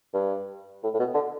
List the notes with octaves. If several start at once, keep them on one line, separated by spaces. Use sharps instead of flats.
G2
A2
A2
B2
D3